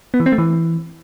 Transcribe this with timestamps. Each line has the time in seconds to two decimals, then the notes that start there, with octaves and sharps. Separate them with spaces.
0.14 B3
0.20 E3
0.26 C4
0.32 A3
0.38 E3